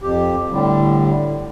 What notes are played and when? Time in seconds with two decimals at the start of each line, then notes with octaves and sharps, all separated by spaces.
0.02 F2 G4
0.51 A2 D3 G3